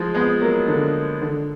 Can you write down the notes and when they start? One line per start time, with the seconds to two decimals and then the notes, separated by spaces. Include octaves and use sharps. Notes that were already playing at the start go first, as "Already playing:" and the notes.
Already playing: F3 G#3
0.14 G#3 B3
0.41 F#3 A#3
0.68 D3
1.22 D3